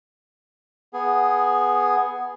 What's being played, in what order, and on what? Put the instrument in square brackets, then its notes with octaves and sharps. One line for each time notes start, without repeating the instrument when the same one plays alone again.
[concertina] B3 G#4